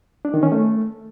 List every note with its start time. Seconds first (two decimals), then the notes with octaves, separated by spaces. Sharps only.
0.25 D4
0.34 D#3
0.43 C#4
0.52 A3